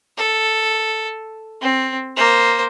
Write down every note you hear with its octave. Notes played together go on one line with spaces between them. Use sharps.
A4
C4
A#3 C5